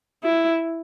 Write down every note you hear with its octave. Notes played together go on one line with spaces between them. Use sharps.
E4